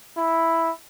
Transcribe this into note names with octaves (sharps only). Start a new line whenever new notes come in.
E4